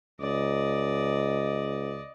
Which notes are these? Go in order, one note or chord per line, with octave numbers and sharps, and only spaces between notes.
C#2 D5 D#5